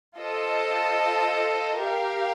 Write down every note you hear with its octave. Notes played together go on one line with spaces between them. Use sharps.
F4 A4 C5 D#5 A5
G4 A#4 F5